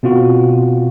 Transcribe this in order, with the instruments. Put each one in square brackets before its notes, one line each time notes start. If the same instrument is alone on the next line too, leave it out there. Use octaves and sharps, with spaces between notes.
[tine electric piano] B2 C4 F4 F#4